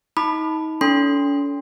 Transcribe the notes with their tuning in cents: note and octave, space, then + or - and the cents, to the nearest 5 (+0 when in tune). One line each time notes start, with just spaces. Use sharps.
D#4 +30 B5 +0 D6 +35
C#4 +45 A4 -5 C6 -5